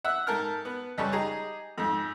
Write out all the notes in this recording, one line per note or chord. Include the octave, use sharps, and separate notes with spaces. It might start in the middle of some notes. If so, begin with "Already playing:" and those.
E5 F#5 E6
G#2 A4 A#4 F6
B3
C#2 G3 A4 C#6
D#4 G4 G#4 A#5
F2 G#2